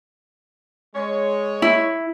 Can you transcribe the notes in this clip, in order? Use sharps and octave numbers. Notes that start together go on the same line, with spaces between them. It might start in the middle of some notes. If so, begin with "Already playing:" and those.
G#3 C#5
E4